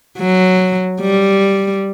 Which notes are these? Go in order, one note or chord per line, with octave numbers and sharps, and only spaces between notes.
F#3
G3